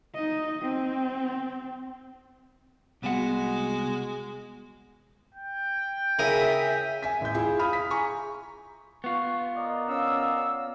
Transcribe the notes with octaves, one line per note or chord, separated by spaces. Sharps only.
D#4 D#5
C4
C2 G#3 B3 F#4 F#5
G5
C#3 E4 A#4 E5 G#5 D#6
E5 G#5 B6
A1 G6
E4 F4 G#4
F5 B5 D#6 F6
B6
G#4 G#5 A#5 C#6
B3 F4 C#6
A#4 D5 D#5
C#4 F5 E6